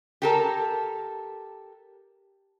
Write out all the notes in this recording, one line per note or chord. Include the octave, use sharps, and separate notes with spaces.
G4 A4 A#4